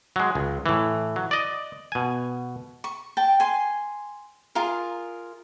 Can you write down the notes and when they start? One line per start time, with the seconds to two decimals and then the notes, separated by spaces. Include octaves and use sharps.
0.16 F#3 G#3
0.35 C#2
0.66 A2 E3
1.16 F#3
1.31 D5 D#5
1.92 B2 G#5
2.84 C#6
3.17 G5 A5
3.40 G#5 C6
4.55 F4 G#4 A#4